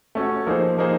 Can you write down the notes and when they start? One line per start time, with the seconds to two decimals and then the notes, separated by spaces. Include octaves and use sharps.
0.15 A3 C#4 F#4
0.47 F3 A#3 D#4 G#4 C5
0.77 F3 A#3 D#4 G#4 C5